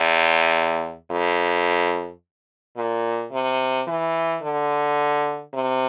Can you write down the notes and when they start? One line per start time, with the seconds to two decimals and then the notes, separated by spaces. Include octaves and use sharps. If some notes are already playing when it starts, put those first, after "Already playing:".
Already playing: E2
1.11 F2
2.77 A#2
3.32 C3
3.87 E3
4.42 D3
5.53 C3